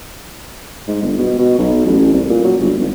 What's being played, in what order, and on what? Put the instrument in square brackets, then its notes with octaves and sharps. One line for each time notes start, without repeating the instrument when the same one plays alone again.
[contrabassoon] G#2
G1
B2
B2
B1
A1
C2
A#2
F#3
G1
G#1